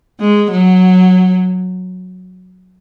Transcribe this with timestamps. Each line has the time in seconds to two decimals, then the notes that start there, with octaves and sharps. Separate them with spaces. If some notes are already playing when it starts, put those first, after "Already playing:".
0.20 G#3
0.51 F#3